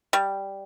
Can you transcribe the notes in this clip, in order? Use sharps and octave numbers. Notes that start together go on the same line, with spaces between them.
G3